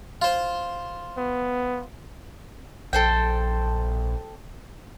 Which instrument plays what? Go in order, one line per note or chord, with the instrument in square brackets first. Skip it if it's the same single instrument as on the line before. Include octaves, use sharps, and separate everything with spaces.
[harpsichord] F4 C5
[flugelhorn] B3
[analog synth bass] A#1 [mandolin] A4 C5 G5